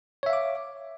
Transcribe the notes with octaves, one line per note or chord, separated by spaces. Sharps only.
C#5 E5 F5 D6